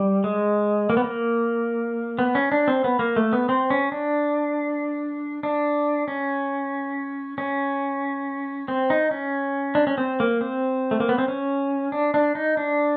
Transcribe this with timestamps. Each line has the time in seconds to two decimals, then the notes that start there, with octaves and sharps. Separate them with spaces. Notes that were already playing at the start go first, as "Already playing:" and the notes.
Already playing: G3
0.24 G#3
0.90 A#3
0.97 B3
1.04 A#3
2.19 B3
2.35 C#4
2.52 D4
2.68 C4
2.84 B3
2.99 A#3
3.16 A3
3.33 B3
3.49 C4
3.70 C#4
3.92 D4
5.43 D4
6.08 C#4
7.38 C#4
8.68 C4
8.90 D#4
9.11 C#4
9.75 D4
9.87 C#4
9.98 C4
10.20 A#3
10.41 C4
10.91 A3
11.00 A#3
11.09 B3
11.18 C4
11.28 C#4
11.92 D4
12.14 D4
12.35 D#4
12.57 D4